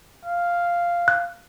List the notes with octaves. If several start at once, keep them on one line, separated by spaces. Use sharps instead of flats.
F5
F#6